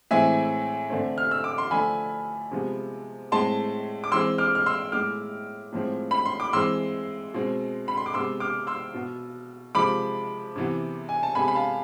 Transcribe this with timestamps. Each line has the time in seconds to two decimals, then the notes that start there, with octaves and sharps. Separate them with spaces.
0.11 A2 E3 G#3 C4 E5 G#5
0.90 D3 A3 C4
1.18 F6
1.31 E6
1.44 D6
1.58 C6
1.71 D3 F3 A3 G#5 B5
2.51 C3 F3 G#3 B3
3.32 A2 G#3 C4 A5 C6
4.04 D6
4.12 E3 G#3 C4 C6 E6
4.38 D6 F6
4.55 F6
4.66 C6 E6
4.92 A2 G#3 B3 D6 F6
5.73 A2 F3 G#3 C4
6.11 B5
6.25 C6
6.40 D6
6.53 E3 G#3 C4 C6 E6
7.34 B2 G#3 C4
7.88 B5
7.97 C6
8.06 D6
8.14 C3 G#3 B3 C6 E6
8.40 D6 F6
8.67 C6 E6
8.94 B2 B3
9.75 C3 F3 G#3 B5 D6
10.56 C3 E3 B3
11.09 G#5
11.23 A5
11.35 C3 G#3 B3 G#5 B5
11.48 B5
11.55 F5 A5